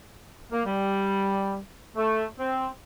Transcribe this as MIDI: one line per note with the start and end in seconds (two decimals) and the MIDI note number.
0.52 0.62 58
0.66 1.58 55
1.97 2.24 57
2.39 2.67 60